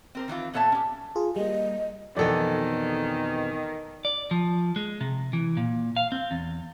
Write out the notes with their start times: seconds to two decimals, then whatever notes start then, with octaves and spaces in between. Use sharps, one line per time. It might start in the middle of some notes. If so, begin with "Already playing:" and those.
0.15 C4 A#4 C5
0.28 D#3 E3 C4 F4
0.53 A#2 B3 A4 C#5 E5 A5
0.72 C#4 G4
1.16 F4 G#4
1.36 G3 A#3 D#5
2.17 F2 B2 D#3 E3 A4 D5
4.05 D5
4.31 F3
4.76 G#3
5.01 C3
5.33 E3
5.57 A#2
5.96 F5
6.12 C4
6.31 E2